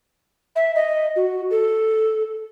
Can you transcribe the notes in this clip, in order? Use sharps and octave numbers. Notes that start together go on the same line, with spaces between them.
E5
D#5
F#4
A4